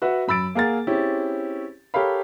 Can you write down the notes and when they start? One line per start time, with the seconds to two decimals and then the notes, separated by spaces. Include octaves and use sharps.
0.02 F#4 B4 E5 F#5
0.28 F#2 B5 E6 A6 D7
0.55 A#3 G#4 A#4 F#5 A6
0.87 C4 C#4 E4 G4 G#4
1.94 G4 A4 A#4 C#5 F5 B5